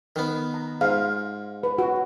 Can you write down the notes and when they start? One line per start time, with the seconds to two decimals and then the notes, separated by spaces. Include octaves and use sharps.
0.16 D#3 B3
0.54 A#5
0.81 G#2 F5
1.63 B4
1.78 F#4